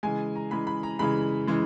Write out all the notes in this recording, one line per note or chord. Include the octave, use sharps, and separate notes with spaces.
C#3 E3 G#3 G#5
A#5
C#3 E3 G#3 B5
B5
A#5
C#3 E3 G#3 B5
C#3 E3 G#3